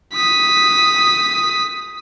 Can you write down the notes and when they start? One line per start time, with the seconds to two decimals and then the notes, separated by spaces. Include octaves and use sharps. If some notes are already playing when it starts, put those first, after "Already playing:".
0.14 D#6 B6